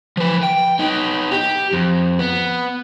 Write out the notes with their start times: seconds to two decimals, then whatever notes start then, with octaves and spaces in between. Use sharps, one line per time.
0.17 F3 B4
0.43 G5
0.79 B3 D#4
1.32 G4
1.73 F2
2.19 B3